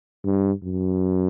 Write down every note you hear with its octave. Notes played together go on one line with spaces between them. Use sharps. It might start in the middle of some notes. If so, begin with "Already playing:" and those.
G2
F#2